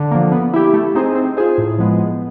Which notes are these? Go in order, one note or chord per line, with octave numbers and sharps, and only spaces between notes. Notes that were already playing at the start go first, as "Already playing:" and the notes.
Already playing: D3
F3 A#3
B3
E4 G4
A3
C4 D#4 G#4 C5
C4
F4 G#4 C5
A2
F3 G#3 B3
B3